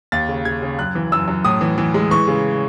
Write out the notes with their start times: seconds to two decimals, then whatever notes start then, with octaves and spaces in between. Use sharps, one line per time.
0.12 D#2 A6
0.29 C#3
0.45 C#3 G#6
0.62 C#3
0.79 F#2 F#6
0.95 E3
1.12 F#2 E6
1.28 F#2
1.45 A2 D#6
1.61 E3
1.78 E3
1.94 G#3
2.11 E3 C#6
2.28 C#3